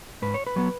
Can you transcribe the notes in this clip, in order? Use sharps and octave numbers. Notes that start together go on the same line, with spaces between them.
G#2 B4
C#5
B4
F#3 B3